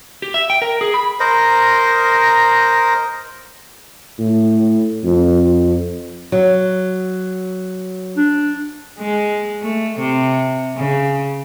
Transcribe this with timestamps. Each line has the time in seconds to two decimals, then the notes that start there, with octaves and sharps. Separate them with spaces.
0.22 G4
0.34 E5
0.50 G5
0.62 A#4
0.81 G#4
0.94 B5
1.20 A#4 C5 D#5
4.19 A2
5.04 F2
6.32 F#3
8.17 D4
9.00 G#3
9.62 A3
10.00 C3
10.76 C#3